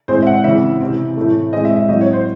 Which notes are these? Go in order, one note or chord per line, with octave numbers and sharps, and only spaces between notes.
A2 G#3 C4 C5
E5
F#5
C#3 E3 C4 E5
C3 E3 C4
A2 E3 A3
A2 G#3 C4 D#5
E5
E5
A2 F#3 C4 D#5
C#5
C5